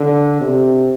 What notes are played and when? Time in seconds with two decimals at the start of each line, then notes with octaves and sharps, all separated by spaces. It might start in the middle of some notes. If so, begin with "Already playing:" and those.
Already playing: D3
0.41 C3